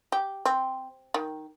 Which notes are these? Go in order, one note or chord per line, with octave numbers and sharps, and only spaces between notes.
G4
C4
D#3